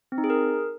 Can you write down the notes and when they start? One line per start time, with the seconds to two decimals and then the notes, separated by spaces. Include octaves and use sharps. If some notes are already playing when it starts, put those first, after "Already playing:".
0.12 C4
0.18 D#4
0.24 G#4
0.30 A#4